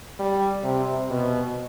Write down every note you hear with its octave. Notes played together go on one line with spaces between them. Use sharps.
G3
C3
B2